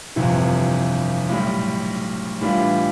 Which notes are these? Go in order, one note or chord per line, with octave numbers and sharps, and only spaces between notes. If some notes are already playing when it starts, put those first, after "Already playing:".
G1 F2 C3 E3
B1 A2 G3
A2 E3 G3 D4 F4